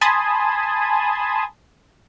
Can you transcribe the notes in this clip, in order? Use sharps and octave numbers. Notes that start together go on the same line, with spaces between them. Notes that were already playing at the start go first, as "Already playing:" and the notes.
G#5 A5 B5 C6 D#6 G#6